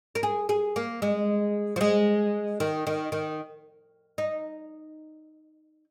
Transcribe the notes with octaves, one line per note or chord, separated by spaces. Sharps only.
A#4
G#4
G#4
A#3
G#3
F3
G#3
D#3
D#3
D#3
D#4